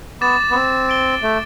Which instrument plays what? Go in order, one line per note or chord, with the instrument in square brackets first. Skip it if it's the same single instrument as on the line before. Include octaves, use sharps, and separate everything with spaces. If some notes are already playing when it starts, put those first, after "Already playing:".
[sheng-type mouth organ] B3 [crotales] D6 A6 E7
[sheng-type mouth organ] B3
C4
[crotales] A6 D7 G7
[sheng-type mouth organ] A3